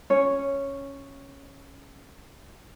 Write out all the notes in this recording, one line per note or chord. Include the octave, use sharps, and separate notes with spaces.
C#4 C#5